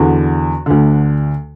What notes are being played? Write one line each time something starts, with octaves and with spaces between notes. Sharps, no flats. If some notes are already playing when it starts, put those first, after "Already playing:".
Already playing: E2 D3 F#4
D2 D3